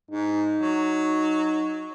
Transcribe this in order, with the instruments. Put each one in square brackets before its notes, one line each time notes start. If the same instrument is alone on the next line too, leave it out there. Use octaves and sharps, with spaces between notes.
[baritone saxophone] G#2 [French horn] D#4
[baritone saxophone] F#3